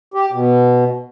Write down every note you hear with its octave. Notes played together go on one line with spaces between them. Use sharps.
G4
B2